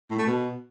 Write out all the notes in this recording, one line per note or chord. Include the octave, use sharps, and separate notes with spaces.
A2
A3
B2